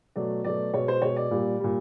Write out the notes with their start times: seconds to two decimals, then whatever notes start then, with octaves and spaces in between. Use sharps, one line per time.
0.16 B2 F#3 A3 D5
0.44 B2 F#3 A3 D5
0.74 B2 G#3 C#5
0.88 C5
1.02 B2 G#3 C#5
1.16 D5
1.31 A#2 G3
1.60 A#2 G3